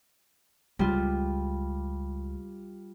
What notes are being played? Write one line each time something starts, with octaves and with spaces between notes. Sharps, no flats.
C#2 G3 F4